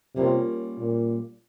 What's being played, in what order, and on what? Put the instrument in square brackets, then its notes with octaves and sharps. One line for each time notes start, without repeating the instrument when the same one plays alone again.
[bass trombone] C3 [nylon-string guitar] G3 A#3 C#4 F4
[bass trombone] A#2